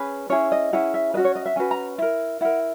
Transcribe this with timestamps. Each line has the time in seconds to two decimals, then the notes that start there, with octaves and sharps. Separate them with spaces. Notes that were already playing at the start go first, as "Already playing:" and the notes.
Already playing: C#4 G#4 B4
0.30 C#4 E4 G#4 C#5
0.52 D#5
0.73 C#4 E4 G#4 F#5
0.94 E5
1.14 C#4 F#4 B4 D#5
1.25 C#5
1.35 D#5
1.46 E5
1.56 C#4 F#4 B4 G#5
1.71 A#5
1.98 E4 A#4
2.41 E4 A#4 F#5